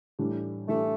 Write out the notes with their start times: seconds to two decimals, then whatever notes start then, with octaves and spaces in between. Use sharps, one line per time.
0.19 A2 E3 G3 D4
0.68 A2 E3 G3 A3 D4